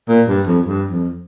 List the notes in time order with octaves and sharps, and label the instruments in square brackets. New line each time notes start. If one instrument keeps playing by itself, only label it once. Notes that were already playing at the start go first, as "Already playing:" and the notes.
[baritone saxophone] A#2
G2
F2
G2
F2